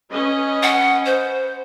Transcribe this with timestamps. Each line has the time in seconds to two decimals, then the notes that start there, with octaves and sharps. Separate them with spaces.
0.12 C#4 B4 D#5
0.63 F#5
1.06 C5